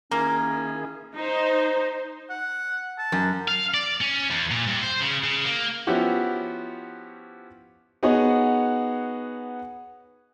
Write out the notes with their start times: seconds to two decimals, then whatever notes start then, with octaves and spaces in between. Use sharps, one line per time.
0.11 D#3 A#3 C#4 E4 G#4 A#5
1.16 D#4 C5
2.30 F#5
2.98 A5
3.12 F#2
3.48 F5
3.74 D5
4.01 C#4
4.31 E2
4.51 A#2
4.67 G2
4.83 C5
5.01 C#3
5.23 C#3
5.45 A#3
5.87 F3 B3 C#4 E4 F#4 G4
8.03 B3 D#4 F#4 G#4 C#5 F#5